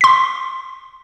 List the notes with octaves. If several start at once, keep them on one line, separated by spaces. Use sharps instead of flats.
C6 B6